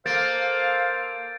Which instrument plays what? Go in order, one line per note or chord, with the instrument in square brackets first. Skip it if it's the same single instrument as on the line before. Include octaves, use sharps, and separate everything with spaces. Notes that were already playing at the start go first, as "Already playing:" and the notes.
[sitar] A#3 [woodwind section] A4 C5 F5 [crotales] G6 A6 D7